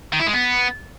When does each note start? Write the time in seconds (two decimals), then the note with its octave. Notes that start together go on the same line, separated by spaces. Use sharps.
0.13 D#3
0.20 E4
0.26 G#3
0.33 B3